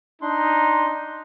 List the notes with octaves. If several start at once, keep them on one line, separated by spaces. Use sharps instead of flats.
D4 D#4 C6